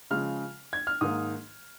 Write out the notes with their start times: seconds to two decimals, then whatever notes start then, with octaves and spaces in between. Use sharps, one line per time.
0.11 C#3 F3 G#3 F6
0.73 G#6
0.87 F6
1.01 G#2 D#3 A#3 D#6